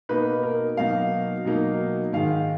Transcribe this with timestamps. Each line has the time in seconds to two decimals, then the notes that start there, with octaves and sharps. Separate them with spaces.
0.09 B2 A#3 D#4 B4
0.43 A#4
0.77 B2 F#3 A#3 D#4 F5
1.45 B2 F#3 A#3 D#4
2.13 G#2 D#3 G#3 F5